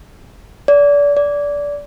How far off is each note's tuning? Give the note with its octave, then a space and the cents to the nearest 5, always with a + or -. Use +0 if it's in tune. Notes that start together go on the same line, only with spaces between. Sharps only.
D5 -30
D5 -20